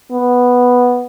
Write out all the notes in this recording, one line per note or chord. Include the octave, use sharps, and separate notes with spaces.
B3